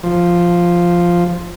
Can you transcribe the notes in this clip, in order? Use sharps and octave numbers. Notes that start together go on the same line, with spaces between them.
F3